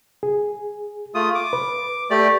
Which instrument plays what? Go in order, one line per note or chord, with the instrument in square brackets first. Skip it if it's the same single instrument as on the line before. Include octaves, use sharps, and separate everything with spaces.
[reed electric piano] G#4
[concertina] A3 F4 D#6
D6
[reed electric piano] B4
[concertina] A3 G4 D5